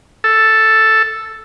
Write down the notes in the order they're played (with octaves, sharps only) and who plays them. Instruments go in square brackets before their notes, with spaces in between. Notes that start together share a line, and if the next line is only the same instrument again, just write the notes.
[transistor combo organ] A4